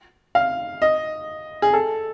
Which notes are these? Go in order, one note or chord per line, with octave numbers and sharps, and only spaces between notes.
F5
D#5
G#4
A4